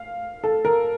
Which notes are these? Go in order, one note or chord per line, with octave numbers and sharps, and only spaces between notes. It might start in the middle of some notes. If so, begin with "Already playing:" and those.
Already playing: F5
A4
A#4